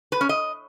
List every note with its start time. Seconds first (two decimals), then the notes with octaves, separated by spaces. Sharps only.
0.12 B4
0.21 C#4
0.29 D#5